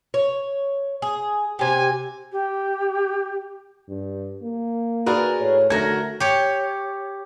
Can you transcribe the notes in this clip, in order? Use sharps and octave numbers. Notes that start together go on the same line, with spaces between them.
C#5
G#4
C3 G4 G#5
G4
G2
A#3
F#4 G#4 A#4 B4 D5
A2 C#5
D3 A3 F#4 A#4 G#6 A#6
G4 C#5